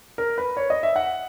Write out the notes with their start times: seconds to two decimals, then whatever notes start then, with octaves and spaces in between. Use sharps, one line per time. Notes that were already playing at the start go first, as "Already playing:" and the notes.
0.18 A#4
0.38 B4
0.57 C#5
0.70 D#5
0.83 E5
0.96 F#5